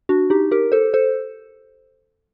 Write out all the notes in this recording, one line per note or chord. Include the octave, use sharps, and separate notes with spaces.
D4 F#4
D#4 G4
G4 A#4
A4 C5
A4 C5